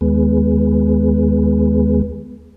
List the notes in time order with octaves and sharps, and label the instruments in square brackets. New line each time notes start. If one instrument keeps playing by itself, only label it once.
[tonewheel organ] D#2 G#3 B3